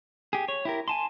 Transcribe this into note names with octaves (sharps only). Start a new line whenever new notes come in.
G4 G#4
C#5
E4 G4 A#4
G#5 A5 C6